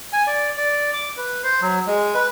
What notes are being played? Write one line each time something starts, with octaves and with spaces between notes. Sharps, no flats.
G#5
D5
D5
D6
B4
C5
F#3
G#3
B4